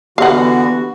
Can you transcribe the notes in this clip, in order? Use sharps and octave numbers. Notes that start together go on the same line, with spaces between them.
D3 E3 B3 F#4 G4 F5 F#5